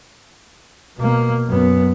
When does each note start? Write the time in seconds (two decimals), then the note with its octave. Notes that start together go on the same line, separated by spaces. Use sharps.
0.98 B2 A#3
1.48 F#2 B3